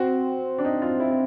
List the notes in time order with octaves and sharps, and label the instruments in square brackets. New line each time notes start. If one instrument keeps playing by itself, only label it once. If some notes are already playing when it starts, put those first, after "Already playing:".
Already playing: [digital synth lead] C4 [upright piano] F#4
[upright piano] D4
D#4
F4
E4
E4